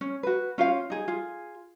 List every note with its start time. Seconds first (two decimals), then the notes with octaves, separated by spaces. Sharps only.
0.01 C#4
0.23 F#4 B4
0.58 C#4 F4 C5 F5
0.90 D#4 G#4
1.08 F4 G#4